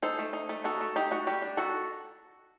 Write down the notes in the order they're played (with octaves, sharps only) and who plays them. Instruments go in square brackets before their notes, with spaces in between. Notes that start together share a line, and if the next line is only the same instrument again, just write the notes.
[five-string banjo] D#4 A4 C5
A3
D#4
A3
D#4 F#4 A4
A3
D#4 G4
A3 F#4
G3 G4
D4
D#3 F#4 A4